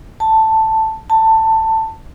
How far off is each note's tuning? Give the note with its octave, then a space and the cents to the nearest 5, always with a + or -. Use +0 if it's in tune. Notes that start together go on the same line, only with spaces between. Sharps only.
A5 +5
A5 +15